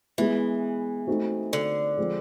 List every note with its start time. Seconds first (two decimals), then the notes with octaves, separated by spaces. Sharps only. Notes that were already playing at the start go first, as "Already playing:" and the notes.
0.18 E3 G#3 B3 E4
1.07 A3 C4 D#4 F#4
1.53 D3
1.97 F3 G#3 C4